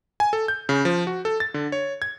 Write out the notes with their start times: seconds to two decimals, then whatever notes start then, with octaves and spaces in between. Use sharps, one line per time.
0.20 G#5
0.33 A4
0.48 G6
0.69 C#3
0.85 F3
1.07 F#4
1.25 A4
1.40 A6
1.54 D3
1.72 C#5
2.02 G#6